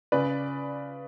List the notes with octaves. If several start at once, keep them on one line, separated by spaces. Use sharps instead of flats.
C#3 B4 D5